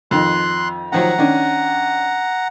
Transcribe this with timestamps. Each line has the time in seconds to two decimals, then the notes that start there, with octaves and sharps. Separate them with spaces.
0.11 F2 D#3 C6 F#6
0.92 D#3 F3 F#3 F#5 A#5
1.18 D#3 C#4 D4